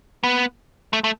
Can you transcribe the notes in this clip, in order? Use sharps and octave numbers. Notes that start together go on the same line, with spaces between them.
B3
A3
A3